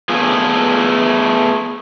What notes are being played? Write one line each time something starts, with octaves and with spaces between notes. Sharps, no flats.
A3 B3 F4 G#4